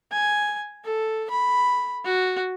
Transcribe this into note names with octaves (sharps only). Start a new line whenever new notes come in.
G#5
A4
B5
F#4